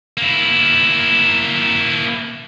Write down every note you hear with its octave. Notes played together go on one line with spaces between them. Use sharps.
A#3 E4